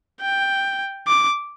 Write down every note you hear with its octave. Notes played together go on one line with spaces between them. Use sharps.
G5
D6